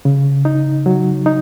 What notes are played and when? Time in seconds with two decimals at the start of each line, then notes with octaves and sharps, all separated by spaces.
0.05 C#3
0.45 D#4
0.86 F#3
1.26 D#4